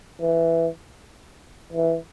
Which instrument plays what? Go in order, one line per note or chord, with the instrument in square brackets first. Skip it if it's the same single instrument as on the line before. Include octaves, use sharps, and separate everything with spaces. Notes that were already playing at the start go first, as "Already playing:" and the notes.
[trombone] E3
E3